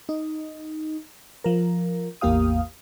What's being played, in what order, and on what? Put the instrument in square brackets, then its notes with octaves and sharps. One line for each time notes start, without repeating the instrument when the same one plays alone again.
[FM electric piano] D#4
F3 A#4
A1 E2 A#3 G4 F5 D#6